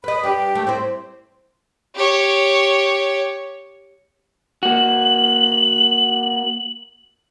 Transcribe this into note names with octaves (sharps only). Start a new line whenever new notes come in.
B4 D#5 B5
G3 D4 G4 B4
A3
C4 E4 C5
G4 C#5
A#3 F#4 F#7